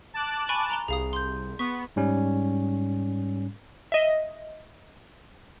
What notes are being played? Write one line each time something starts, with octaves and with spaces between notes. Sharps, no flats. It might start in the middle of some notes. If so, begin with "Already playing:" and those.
A5 D6 F#6
G#5 B5 C#6
A#5 F7 G7
C2 G#4 F5 D#6
C6 G6
B3 C#6 B6
G#2 G3 C#4
D#5 E5